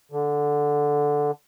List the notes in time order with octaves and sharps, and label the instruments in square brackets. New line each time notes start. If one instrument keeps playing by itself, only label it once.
[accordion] D3